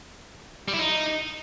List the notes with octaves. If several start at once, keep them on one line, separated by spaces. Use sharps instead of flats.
G3
E4
D#4